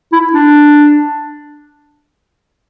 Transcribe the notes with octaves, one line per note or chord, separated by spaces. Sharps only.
E4
D4